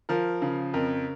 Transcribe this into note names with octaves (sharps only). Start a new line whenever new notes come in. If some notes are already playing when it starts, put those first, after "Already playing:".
F3 A#4
C#3
F2 A#4